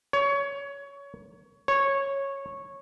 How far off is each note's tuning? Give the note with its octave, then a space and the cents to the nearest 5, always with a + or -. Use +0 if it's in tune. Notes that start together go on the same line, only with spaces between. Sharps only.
C#5 +20
C#5 -10